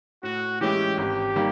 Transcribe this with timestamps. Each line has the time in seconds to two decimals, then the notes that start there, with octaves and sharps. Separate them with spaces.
0.23 A2 F#4
0.61 E3 G#3 C#4 E4 G4
0.98 G#1 G4
1.35 D#3 G3 A#3